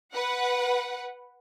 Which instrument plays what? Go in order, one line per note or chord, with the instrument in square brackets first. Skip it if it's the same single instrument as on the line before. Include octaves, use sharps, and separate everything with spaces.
[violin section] B4 F#5